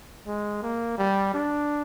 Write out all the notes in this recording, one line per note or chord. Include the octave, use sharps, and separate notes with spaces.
G#3
A#3
G3
D4